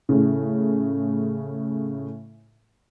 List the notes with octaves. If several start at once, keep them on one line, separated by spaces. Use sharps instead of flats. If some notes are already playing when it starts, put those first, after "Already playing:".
A2 C#3